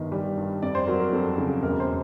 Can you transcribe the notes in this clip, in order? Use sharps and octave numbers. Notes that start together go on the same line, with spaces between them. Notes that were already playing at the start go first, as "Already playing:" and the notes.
Already playing: G1 D#3
G3
G2
F2 D5
C5
F#3 A#4
A#4
F2 A4
C#3
E1 A#4
C5